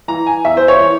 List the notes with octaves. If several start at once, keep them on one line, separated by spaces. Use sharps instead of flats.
E3 A#5
G#5
E2 E5
C5
C#5
E3